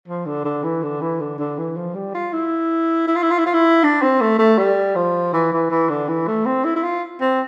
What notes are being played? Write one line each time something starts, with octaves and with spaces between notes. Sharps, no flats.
F3
D3
D3
E3
D3
E3
D3
D3
E3
F3
G3
F4
E4
E4
F4
E4
F4
E4
F4
E4
D4
C4
A3
A3
G3
F3
E3
E3
E3
D3
E3
A3
C4
E4
E4
F4
C4